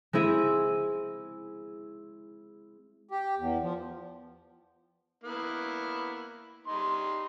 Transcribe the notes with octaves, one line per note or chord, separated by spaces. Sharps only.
G#3 C4 E4 G#4
G4
E2
F3
A#3 B3 E4
G3 D#4 C6